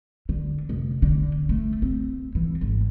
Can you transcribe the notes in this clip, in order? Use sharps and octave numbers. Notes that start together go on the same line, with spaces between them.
D3
F1
D3
A3
C4
E3
G#1